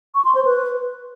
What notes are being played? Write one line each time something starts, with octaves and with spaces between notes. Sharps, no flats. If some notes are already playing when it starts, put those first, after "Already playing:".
C#6
C6
C5
B4